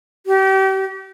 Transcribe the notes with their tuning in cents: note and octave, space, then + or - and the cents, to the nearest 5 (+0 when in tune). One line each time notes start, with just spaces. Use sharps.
G4 -35